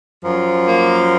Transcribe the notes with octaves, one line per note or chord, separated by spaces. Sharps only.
F#2 F3
A#3